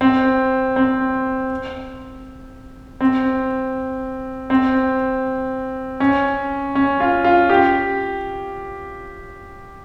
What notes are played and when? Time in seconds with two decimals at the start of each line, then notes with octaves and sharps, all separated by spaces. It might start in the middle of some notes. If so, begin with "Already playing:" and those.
0.01 C4
0.76 C4
3.00 C4
4.50 C4
6.00 C#4
6.75 C#4
7.00 F4
7.24 F4
7.50 G4